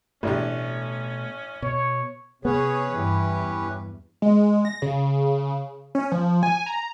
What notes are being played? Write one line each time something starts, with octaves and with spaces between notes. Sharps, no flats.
A1 B2 A3 C#4 D4 G4
B2 C#5
C3 B3 C#4 G#4 B4 C#5
E2 G2 E3 E4 G4
G#3
A#6
C#3
C#4
F3
G#5
A#5